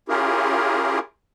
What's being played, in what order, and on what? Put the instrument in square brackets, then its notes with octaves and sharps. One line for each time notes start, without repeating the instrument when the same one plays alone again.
[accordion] C#4 E4 F4 G4 G#4 A#4